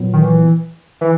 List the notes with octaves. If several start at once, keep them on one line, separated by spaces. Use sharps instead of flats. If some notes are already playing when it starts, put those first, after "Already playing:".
Already playing: A#2 F#3 B3
D#3
E3
E3